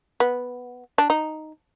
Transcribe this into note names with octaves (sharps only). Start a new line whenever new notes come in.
B3
D4
D#4